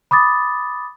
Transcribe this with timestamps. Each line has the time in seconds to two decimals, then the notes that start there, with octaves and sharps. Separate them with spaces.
0.11 B5 D6 D#6 A6